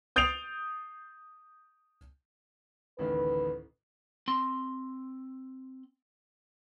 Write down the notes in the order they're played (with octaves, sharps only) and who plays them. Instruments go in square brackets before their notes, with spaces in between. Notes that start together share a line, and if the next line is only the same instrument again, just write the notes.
[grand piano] D#6 G6 A6 C7 D7 F7
[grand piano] A1 D2 D#3 [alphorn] B4
[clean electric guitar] C4 C6